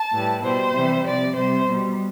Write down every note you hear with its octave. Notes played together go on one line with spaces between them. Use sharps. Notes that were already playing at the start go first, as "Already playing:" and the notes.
Already playing: A5
A2 E3 G3
B2 G3 C5
C3 E3 G3
C3 F3 D5
C3 G3 C5
B2 G3